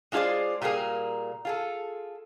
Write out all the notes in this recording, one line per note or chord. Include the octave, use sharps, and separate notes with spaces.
G#3 D4 F4 G#4 C5 D5
A#2 G3 A#3 G#4 A#4
F4 G#4 A4